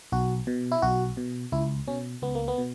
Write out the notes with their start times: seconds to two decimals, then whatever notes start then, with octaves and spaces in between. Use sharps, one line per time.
0.12 B1 F#4
0.47 B2
0.72 E4
0.82 B1 F#4
1.17 B2
1.52 C#2 E4
1.88 B2 C#4
2.22 C#2 B3
2.35 A#3
2.48 B3
2.58 B2